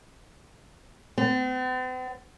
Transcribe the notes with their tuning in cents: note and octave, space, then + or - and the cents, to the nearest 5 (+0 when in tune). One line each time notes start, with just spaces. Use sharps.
C4 -45